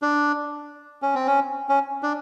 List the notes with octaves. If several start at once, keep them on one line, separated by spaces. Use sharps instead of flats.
D4
C#4
C4
C#4
C#4
D4